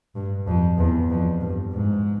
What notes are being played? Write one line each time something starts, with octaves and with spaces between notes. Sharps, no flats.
G2
F2
E2
F2
G2
G#2